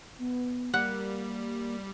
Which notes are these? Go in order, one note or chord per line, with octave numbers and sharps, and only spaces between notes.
B3
G3 A#3 F#5